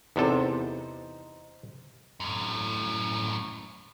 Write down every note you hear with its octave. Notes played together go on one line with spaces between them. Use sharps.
E2 C3 D#4 A4 C5
F#2 A2